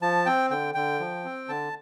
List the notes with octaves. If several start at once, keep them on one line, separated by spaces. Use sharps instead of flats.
F3 A5
C4 G5
D3 G5
D3 G5
F3
C4
D3 A5